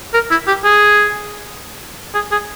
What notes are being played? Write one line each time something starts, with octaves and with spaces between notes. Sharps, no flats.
A#4
E4
G4
G#4
G#4
G#4